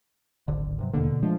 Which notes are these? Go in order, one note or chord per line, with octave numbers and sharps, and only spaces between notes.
D1 G#1 D3
G2 C3 F#3
D#2 B2 D3 A#3
B2
F3 G#3 A3 D4